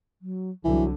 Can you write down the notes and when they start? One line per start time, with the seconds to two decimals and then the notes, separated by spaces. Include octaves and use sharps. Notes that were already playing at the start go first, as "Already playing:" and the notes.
0.22 F#3
0.64 C2 D3 E3 F#3